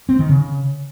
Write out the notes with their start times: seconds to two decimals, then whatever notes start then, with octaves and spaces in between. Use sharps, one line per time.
0.09 C4
0.19 D#3
0.29 C#3